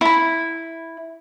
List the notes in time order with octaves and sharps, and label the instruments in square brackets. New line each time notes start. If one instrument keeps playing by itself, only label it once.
[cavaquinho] E4 B5